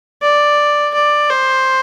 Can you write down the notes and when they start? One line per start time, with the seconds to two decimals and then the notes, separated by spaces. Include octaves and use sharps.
0.22 D5
0.94 D5
1.30 C5